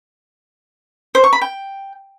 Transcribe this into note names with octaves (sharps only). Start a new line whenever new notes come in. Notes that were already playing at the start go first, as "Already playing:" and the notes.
C5
C#6
B5
G5